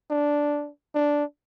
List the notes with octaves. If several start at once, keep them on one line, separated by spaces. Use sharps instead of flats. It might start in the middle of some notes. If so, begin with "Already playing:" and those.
D4
D4